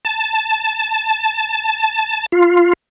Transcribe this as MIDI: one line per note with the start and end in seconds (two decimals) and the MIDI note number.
0.05 2.26 81
2.32 2.73 65